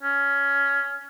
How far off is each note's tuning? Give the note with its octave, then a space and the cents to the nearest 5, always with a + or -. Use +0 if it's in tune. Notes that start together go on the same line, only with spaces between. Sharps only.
C#4 +15